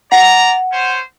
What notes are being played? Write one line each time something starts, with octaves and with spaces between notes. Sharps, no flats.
D5 F#5 A#5
C#4 C5